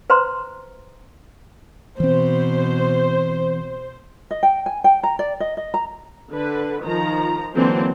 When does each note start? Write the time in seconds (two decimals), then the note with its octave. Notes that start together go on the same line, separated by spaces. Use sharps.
0.10 B4 C5 A#5 C6
2.00 B2 E3 C4 C5
4.31 D#5
4.43 G5
4.66 G#5
4.84 G5
5.03 A#5
5.19 D5
5.40 D#5
5.57 D#5
5.74 A#5
6.31 D3 B4
6.83 D#3 F3 A#5
7.54 D3 E3 F#3 A#3 C4 C5